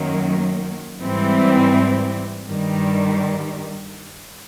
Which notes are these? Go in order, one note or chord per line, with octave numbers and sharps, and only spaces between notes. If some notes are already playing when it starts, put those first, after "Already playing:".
Already playing: F#2 D#3 F#3 A#3
G#2 E3 G3 C4
G2 D#3 G3